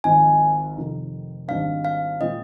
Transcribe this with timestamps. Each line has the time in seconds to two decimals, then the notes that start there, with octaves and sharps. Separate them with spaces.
0.04 G#1 G#2 F3 G#5
0.76 F1 F2 D#3
1.48 G#1 G#2 G3 D4 F5
1.85 F5
2.21 A#2 G#3 C4 D#5